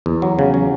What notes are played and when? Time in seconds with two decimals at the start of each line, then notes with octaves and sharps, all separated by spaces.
0.06 E2
0.22 F#3
0.39 C#3
0.54 F#3